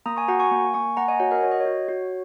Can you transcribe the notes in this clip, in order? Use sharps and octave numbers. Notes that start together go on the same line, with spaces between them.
A#3 A#5 D#6
G#5 C#6
F#4 F#5 A#5
G#5 C#6
A#3
A#3 G#5 C#6
A#3 F#5 A#5
D#5 G#5
F#4 C#5 F#5
A#4 D#5
F#4 C#5
D#5
C#5
F#4
F#4